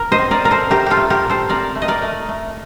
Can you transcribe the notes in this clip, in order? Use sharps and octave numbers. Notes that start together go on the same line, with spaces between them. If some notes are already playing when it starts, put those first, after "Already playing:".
Already playing: A#4
C5 D#5
C4
A#4 D5
C4 A#4
A4 C5
A3 G4 A#4
F4 G4 A4
A3
G4 A#4
A#2
A4 C5
C4 A#4 D5
A3
D#5
A#4 D5
A3
A3